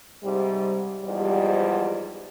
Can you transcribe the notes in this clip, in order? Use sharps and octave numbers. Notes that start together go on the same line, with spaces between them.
G#2 C3 G3
E2 G#2 F3 G3